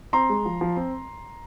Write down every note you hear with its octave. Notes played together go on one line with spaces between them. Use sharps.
C4 A#5 C6
G#3
F3
F3
C4